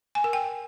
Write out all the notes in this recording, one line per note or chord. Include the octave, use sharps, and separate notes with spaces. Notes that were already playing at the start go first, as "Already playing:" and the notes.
G#5
A#4
G5